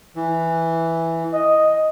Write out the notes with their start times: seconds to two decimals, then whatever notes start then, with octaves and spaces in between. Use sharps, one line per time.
0.16 E3
1.33 D#5